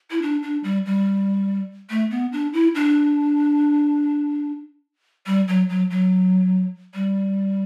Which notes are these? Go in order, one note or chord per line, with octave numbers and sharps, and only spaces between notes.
E4
D4
D4
G3
G3
A3
B3
D4
E4
D4
G3
F#3
F#3
F#3
G3